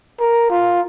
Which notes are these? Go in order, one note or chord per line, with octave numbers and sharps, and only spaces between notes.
A#4
F4